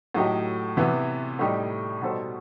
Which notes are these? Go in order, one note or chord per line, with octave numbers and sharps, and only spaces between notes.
A2 F#3 A3 D#4 G4
C3 E3 B3
A2 G3 D#4 G4
B2 G3 D#4 A4 C5